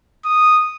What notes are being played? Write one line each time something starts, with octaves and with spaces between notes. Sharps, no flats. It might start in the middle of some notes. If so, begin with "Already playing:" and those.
D#6